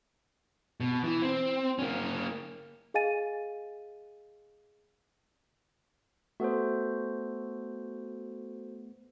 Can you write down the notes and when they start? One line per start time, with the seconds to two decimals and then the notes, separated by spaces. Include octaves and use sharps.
0.80 B2
1.04 E3
1.22 C4
1.79 A#3 C#4
2.94 G#4 D#5 F5 G#5 A6 D#7
6.40 A3 B3 F#4 A4 C5